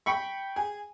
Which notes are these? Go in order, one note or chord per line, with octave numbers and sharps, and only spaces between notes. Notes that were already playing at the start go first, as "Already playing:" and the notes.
G5 B5 C#6
G#4